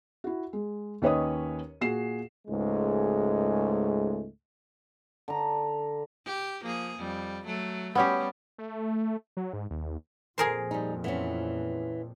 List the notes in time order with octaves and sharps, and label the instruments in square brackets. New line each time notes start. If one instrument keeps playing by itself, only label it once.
[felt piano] E4 F#4
G#3
D#2 C#4 B4 C#5 D#5 D#6
A#2 F#4 G#4 C7 E7
[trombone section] C#2 G#2 G#3 A3
[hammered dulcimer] D3 A#5
[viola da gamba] G4
F3 A#3 G#4
F2 G3
F#3 A3
[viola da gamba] G3 [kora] B3 C#4 G4
[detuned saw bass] A3
F#3
G#2
D#2
[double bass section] F2 A#2 [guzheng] G#4 A#4 C5
[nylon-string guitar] G3 D#4
E3 B3 C#4